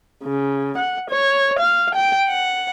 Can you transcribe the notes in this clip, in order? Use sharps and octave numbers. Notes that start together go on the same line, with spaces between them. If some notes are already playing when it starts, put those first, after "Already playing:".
C#3
F#5
C#5
F5
G5
F#5